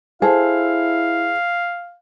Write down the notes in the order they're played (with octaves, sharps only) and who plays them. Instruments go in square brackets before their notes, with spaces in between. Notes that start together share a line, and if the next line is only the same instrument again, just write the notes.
[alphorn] E4 [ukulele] G#4 A4 [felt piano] C5 [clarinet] F5